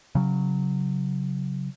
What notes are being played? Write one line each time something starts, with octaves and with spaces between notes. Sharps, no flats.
C#3 F#3